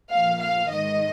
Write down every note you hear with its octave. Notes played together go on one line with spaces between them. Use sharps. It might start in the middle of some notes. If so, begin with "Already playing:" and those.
A#2 F3 F5
F5
G#2 D#3 D#5